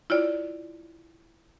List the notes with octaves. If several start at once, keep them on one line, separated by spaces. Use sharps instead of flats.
E4 F4 C#5 D5